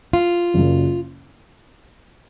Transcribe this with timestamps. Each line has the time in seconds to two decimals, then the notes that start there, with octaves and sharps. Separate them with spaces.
0.13 F4
0.54 F#1 F#2 C#3